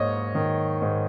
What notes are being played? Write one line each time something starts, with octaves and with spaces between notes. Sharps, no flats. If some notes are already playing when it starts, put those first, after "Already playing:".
Already playing: G#2 A#3 C#5 D#5
D#3
G#2